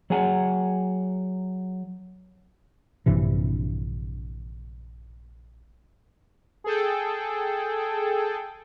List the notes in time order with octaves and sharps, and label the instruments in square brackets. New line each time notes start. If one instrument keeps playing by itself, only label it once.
[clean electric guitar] F#3 G#4 F#5 G#5
[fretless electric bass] A#1 G2 C3 E3
[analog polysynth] G#4 A4 G5